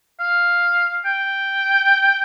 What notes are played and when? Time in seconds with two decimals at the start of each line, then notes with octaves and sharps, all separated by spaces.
0.20 F5
1.05 G5